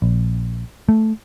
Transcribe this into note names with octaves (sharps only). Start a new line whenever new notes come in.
A#1
A3